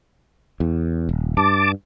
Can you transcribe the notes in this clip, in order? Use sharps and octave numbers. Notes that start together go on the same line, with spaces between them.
E2
D#1
G2 A5 D6